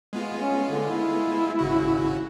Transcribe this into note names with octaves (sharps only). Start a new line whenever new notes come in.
G#3 B3 F4
C#4
D3
E4
G#1 C#3 F#4